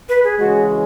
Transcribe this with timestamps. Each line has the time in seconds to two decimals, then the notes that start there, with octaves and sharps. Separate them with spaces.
0.09 B4
0.24 G#4
0.39 C#3 E3 G#3 F#4